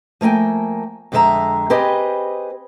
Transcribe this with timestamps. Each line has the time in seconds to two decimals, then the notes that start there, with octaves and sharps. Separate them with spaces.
0.21 F3 A3 A#3 G5 G#5
1.12 F2 D3 G#3 B3 E5 A#5
1.70 C4 G4 G#4 B4 C5 D#5